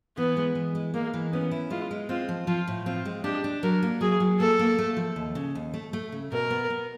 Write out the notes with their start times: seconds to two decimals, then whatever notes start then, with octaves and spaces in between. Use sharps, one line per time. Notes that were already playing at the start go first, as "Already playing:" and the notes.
0.17 E3 B3
0.37 G#3
0.55 E3
0.75 G#3
0.94 G#3 A#3
1.13 E3
1.33 B3 C#4
1.51 E4
1.70 G#3 F4
1.91 G#3
2.09 C4 F4
2.29 F3
2.47 F3 F4
2.67 A2
2.86 C4 F4
3.05 G#3
3.24 D4 G4
3.44 D4
3.63 F#3 A#4
3.83 A#3
4.01 F#3 G#4
4.20 F#3
4.40 A#3 A4
4.59 A#3
4.78 A3
4.97 F3
5.16 D#2
5.35 C#3
5.55 D#2
5.74 A3
5.93 A3
6.12 C#3
6.32 B2 A#4
6.50 B3
6.70 B3